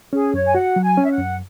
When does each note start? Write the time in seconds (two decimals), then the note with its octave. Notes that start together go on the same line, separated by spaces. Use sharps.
0.13 C#4 G#4
0.34 F#2 C#5
0.46 G#5
0.55 F#4 F#5
0.76 F#3
0.82 G#5
0.97 C#4
1.04 E5
1.11 F#5
1.18 F#2